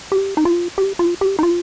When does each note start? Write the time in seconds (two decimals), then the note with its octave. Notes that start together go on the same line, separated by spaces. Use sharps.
0.12 G4
0.37 D#4
0.45 F4
0.78 G4
0.99 F4
1.21 G4
1.39 D#4
1.43 F4